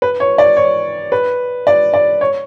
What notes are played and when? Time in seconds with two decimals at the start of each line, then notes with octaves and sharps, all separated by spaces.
0.02 B4
0.20 C#5
0.38 D5
0.57 C#5
1.12 B4
1.67 D5
1.94 D5
2.21 C#5